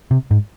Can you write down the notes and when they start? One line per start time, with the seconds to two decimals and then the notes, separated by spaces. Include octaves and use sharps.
0.11 C3
0.31 G#2